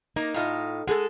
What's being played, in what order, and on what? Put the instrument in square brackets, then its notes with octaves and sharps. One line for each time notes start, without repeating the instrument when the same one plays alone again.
[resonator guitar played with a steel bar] A#3 [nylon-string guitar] D#4
[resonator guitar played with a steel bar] A2 F4 D#5
[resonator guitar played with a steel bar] G#3 A4 [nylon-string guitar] G#4 F#5